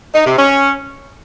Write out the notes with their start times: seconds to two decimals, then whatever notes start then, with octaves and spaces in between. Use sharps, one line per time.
0.14 D#4
0.26 C3
0.38 C#4